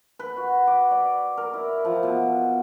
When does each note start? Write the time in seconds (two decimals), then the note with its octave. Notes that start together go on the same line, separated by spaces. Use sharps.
0.19 B4
0.37 F#4
0.67 D6
0.91 D5
1.37 A#4
1.54 E4
1.85 F3
2.03 B2